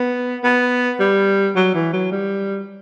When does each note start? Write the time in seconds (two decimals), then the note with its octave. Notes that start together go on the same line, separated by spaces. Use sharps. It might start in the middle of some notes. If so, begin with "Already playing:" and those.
Already playing: B3
0.44 B3
1.00 G3
1.56 F#3
1.74 E3
1.93 F#3
2.11 G3